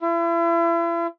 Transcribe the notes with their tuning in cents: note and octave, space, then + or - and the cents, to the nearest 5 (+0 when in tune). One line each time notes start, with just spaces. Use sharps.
E4 +40